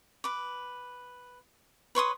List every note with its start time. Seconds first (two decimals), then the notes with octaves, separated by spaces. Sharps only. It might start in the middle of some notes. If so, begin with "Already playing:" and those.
0.24 B4 D6
1.95 B4 C#5 C6 D#6